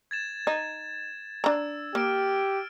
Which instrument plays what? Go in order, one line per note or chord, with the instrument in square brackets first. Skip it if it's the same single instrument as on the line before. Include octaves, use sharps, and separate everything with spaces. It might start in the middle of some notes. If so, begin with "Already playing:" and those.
[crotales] G#6 A6 E7
[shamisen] D#4
[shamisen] D4 A#5 [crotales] E6
[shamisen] A#3 [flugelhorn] G4 [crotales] F6 D7